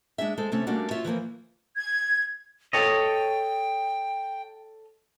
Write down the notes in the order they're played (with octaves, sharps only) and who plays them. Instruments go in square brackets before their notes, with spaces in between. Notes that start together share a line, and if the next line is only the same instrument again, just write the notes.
[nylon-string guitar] G#3 D4 G#4 E5
G#3 A4 C5
C3 A3 C#4
G3 A3 A#3 C#4 D4 F#4
F4 F#4 C#5 E5
E3 F3 A3 A#3
[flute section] G#6
[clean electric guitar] A4 C#5 D#5 [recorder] G5